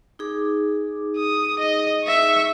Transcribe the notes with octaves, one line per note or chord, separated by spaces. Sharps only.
D#4 G#4 D6
D#6
D#5
E5 C#6